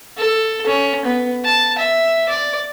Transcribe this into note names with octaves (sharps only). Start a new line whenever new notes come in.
A4
C#4
B3
A5
E5
D5